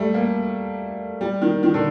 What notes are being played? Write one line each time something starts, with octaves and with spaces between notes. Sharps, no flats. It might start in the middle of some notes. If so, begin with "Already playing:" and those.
Already playing: G3 A3
A#3
G3
D#3
D#3
D3